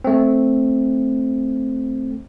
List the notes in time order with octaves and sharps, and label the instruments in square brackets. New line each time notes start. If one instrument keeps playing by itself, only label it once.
[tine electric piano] A3 C4